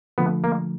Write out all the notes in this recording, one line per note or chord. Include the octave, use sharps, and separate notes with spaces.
D3 F3 A3 B3
A#3